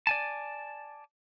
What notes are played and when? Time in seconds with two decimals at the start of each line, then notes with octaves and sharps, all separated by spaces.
0.07 D5 G#5 A5